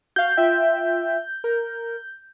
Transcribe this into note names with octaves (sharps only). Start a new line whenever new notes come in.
F#4 F5 G6
F4 E5 G5
A#4